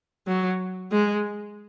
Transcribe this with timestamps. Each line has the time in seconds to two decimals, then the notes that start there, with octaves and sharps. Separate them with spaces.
0.27 F#3
0.92 G#3